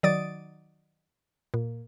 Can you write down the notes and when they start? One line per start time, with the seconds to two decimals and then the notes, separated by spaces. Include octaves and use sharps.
0.03 D#3 F#3 D5 D#6 A6 D7
1.54 A#2